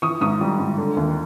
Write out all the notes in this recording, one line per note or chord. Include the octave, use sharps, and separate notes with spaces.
E3 C#6 D#6
G#2 C#6 D#6
G3
G#2
D3
D#2